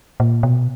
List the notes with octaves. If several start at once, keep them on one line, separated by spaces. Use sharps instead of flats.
A#2
B2